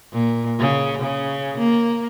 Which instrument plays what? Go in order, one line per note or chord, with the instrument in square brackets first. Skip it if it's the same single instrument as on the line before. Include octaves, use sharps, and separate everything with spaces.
[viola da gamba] A#2
C#3
C#3
A#3